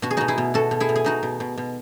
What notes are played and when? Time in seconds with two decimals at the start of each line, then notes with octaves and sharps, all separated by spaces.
0.02 B2 F#4
0.11 G#4
0.17 B2 D#4 F#4
0.28 E4 G#4
0.38 B2
0.54 B2 F#4 A4
0.71 B2
0.80 E4 G#4
0.89 B2
0.96 G#4
1.05 B2 D#4 F#4
1.23 B2
1.40 B2
1.58 B2